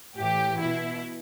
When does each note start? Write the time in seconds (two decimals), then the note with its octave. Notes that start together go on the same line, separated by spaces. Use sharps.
0.17 A2 E3 G4
0.60 B2 E4